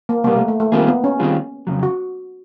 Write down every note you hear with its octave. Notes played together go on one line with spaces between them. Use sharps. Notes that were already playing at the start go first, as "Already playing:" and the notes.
A#3
C2 B2 G3 A#3 B3
A3
A3
A3
D#3 G3 A#3 C4 F4 G#4
B3
C#4
D#3 G3 C4 F4 G#4
F2 C#3 F#3
F#4